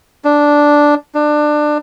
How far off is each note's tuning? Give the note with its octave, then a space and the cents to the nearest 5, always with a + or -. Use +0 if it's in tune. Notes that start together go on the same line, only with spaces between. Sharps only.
D4 -5
D4 +20